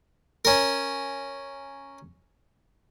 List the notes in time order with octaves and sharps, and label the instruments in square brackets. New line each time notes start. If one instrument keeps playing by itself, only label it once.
[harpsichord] C#4 A#4